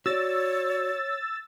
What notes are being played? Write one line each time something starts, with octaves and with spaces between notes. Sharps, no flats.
F#4 C#5 D5 E6 A6